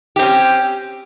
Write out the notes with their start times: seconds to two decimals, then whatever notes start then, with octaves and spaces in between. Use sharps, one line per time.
0.16 G4
0.19 C4
0.22 C#4